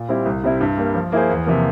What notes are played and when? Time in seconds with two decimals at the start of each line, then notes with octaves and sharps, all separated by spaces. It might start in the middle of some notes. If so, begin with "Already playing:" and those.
Already playing: A#2
0.08 G3 C4 E4 G4
0.25 C2
0.43 C3 G3 C4 E4
0.60 G2
0.78 G3 A#3
0.94 F3
1.12 A#3 E4 G#4 C5
1.30 E2
1.46 C3 F3 A#3